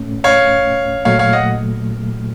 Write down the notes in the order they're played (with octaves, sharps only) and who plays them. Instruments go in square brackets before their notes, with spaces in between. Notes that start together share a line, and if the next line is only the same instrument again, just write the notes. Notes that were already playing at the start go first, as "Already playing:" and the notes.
Already playing: [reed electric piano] A2 A3 C#4
[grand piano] C#5 F5
[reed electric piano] A#2 F#3 A3 [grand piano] C#5 F5
[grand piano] C#5 F5
D#5 F#5